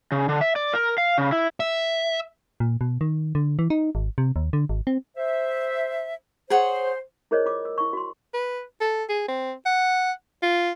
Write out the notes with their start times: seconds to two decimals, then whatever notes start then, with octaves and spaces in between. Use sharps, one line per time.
0.12 C#3
0.29 D3
0.41 E5
0.56 D5
0.73 A#4
0.98 F5
1.18 C#3
1.32 E4
1.60 E5
2.60 A#2
2.81 B2
3.01 D#3
3.35 D3
3.59 E3
3.70 D#4
3.95 G#1
4.18 C3
4.36 D#2
4.53 D3
4.69 G#1
4.87 C4
5.17 C5 E5
6.50 G#4 C5 C#5 F#5
7.31 E4 G#4 A#4 C5 C#5 D#5
7.46 F4 D6
7.65 E6
7.78 E4 C#6
7.93 F#4 C6
8.33 B4
8.80 A4
9.09 G#4
9.28 C4
9.65 F#5
10.42 F4